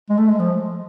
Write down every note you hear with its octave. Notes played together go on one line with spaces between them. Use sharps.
G#3
A3
G#3
F3